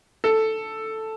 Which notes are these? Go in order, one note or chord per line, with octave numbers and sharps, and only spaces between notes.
A4